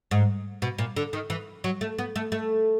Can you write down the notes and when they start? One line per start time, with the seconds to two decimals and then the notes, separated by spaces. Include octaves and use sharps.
0.11 G#2
0.62 B2
0.78 A#2
0.97 D3
1.13 D#3
1.30 E3
1.64 F#3
1.81 A3
1.99 B3
2.16 A3
2.32 A3